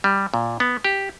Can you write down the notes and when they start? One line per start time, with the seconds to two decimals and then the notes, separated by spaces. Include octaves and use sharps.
0.04 G3
0.34 A#2
0.60 B3
0.84 G4